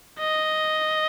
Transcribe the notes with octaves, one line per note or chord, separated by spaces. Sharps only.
D#5